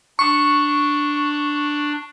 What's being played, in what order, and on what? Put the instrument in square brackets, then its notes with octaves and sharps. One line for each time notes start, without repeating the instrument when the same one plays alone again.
[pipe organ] D4 [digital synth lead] C#6